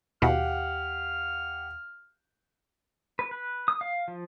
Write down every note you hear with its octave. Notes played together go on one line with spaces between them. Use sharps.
D#2 B2 E4 G4 F5 F#5 F6
B4
B4
D#6
F5
F3